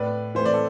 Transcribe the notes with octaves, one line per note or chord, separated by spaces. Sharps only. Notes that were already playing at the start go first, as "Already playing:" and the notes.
Already playing: A2 B4 D5
E3 A3 C5
D5
A4